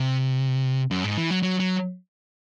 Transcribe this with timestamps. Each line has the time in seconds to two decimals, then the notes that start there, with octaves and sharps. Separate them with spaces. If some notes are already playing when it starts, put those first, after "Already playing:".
Already playing: C3
0.91 F#2
1.04 G#2
1.17 E3
1.30 F#3
1.43 F#3
1.60 F#3